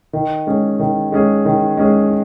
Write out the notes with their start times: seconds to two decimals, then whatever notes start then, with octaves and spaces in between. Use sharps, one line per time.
0.13 D#3
0.47 G#3 C#4 G#4
0.79 D#3
1.12 G#3 C#4 G#4
1.45 D#3
1.77 G#3 C#4 G#4